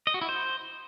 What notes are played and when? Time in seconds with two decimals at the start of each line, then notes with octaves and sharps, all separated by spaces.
0.07 D#5
0.14 F#4
0.21 E4
0.29 C5